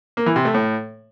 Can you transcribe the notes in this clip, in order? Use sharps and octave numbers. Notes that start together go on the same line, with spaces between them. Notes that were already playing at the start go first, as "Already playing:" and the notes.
A#3
E3
C3
A3
A2